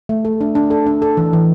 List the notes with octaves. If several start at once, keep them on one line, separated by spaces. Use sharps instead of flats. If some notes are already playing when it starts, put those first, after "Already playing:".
A3
A4
D4
D4
A4
D4
A4
E3
E3